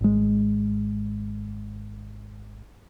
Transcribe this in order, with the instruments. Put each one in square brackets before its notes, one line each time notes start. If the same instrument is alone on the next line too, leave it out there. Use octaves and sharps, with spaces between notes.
[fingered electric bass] G#1 G#3